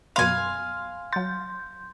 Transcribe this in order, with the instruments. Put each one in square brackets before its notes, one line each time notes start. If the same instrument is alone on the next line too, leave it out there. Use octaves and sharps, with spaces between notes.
[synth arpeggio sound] F#2 B2 B5 [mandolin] F5 G#5 [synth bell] C6
[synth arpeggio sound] F#3 A6 [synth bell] C6 G6